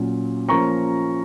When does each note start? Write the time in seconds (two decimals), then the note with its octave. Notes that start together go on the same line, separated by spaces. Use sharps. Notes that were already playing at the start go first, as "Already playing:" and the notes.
Already playing: A#2 F#3 C#4
0.49 F3 A#3 C#4 A#5 C#6